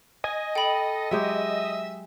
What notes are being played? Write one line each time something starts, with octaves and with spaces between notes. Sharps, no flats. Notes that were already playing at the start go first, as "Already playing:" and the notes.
D#5 G#5
A4 G5 B5
F#3 G#3 G4 E5